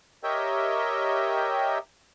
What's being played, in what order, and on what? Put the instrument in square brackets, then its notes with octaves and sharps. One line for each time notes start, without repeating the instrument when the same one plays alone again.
[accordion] G4 A#4 C#5 D#5 E5 G5